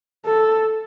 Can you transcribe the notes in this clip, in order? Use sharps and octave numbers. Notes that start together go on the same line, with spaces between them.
A4